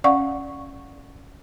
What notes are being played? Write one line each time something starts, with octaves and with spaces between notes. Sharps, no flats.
C#4 D5 F5 F#5 C#6